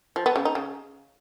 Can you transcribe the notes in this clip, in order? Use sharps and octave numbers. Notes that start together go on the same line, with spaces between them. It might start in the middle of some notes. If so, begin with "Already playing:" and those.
F3
B3
C#3
D#4
C#3